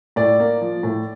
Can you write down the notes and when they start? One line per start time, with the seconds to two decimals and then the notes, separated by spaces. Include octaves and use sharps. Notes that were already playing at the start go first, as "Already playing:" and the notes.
0.16 A2 D5
0.40 A#3
0.61 F3
0.83 A2